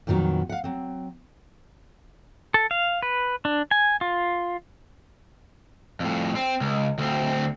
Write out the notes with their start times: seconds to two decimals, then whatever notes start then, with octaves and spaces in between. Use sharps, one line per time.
0.07 F2 A#2 D#3 F#3 B3
0.49 F5 F#5
0.64 F#3 C4
2.54 A4
2.71 F5
3.03 B4
3.45 D4
3.71 G#5
4.01 F4
6.00 F2 A2
6.36 C4
6.61 C#2
6.98 D2 C4